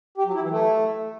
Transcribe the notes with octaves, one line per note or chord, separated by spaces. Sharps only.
G4
F#3
E4
E3
A3